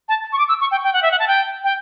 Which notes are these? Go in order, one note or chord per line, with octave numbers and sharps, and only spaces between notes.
A5
C#6
D6
E6
C#6
G5
G5
F#5
E5
F#5
A5
G5
G5